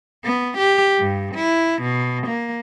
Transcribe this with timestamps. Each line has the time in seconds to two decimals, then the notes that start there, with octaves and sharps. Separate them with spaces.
0.25 B3
0.58 G4
0.99 G2
1.35 E4
1.83 B2
2.28 A#3